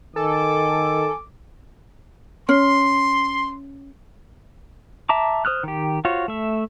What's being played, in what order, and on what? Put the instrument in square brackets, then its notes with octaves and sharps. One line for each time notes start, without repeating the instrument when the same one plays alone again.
[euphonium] D#3 [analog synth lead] A4 [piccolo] G#5 [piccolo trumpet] D6
[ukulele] C#4 [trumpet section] C6
[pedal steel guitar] E5 A5 A#5 D6
C5 D#6 F6 F#6
D#3 G4
F4 F#4 C5 C#5
A3 E5